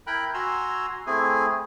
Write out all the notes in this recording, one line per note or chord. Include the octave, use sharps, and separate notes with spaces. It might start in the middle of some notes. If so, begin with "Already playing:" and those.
E4 A#4 G5 B5 F#6
F#4 G#5 A#5 C6 E6
A3 C4 E4 G#4 G#5